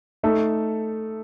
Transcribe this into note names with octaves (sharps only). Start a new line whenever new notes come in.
A3 D#4 A4